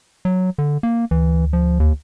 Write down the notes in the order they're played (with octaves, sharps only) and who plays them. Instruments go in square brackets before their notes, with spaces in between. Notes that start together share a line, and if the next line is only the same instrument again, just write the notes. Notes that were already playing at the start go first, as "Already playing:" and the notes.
[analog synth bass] F#3
D3
A#3
[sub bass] D2 [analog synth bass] E3
[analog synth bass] F3
D#2